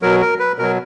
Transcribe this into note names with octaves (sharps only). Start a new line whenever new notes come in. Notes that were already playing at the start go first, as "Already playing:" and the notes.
B2 F#3 A#4
A#4
B4
B2 F#3 A#4